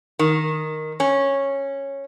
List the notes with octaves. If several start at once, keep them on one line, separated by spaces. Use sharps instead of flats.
D#3
C#4